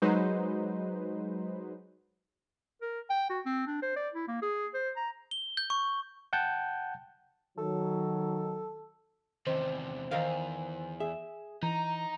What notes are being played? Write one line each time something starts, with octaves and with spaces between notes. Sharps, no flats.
F#3 G#3 D#4 B4 C5
A#4
G5
F#4
C4
D4
C5
D5
E4
A#3
G#4
C5
A#5
G7
G6
C#6
F#5 G5 A5 G6
D#3 F#3 A4
E2 C3 D#3 C5
E2 D#3 A#4 F5
G#4 E5
E3 D#4 A#5